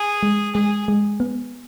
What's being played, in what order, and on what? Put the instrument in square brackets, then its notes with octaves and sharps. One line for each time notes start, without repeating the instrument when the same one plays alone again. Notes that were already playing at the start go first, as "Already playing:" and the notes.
Already playing: [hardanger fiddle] G#4
[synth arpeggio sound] G#3
[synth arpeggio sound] G#3 [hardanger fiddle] G#4
[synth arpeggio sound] G#3
B3